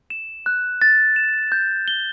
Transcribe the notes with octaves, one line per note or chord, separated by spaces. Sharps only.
E7
F#6
A6
E7
G6
G7